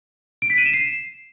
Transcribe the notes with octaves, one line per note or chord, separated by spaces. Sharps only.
D7
B6
D#7
E7
C7